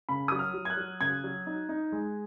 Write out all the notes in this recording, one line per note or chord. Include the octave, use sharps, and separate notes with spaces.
C#3 B5
F#3 D#6
F6
F#3
G#6
F#6
F#3
C#3 G#6
F#3
D#4
D#4
G#3